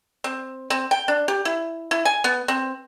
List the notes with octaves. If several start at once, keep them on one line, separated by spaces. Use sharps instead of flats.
C4
C4
G5
D4
G4
E4
E4
G#5
B3
C4